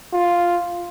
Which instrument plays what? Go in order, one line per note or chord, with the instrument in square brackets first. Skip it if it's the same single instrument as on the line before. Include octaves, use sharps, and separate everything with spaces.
[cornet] F4